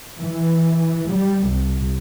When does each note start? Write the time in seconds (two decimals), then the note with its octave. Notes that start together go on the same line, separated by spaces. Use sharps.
0.20 E3
1.10 G3
1.46 C2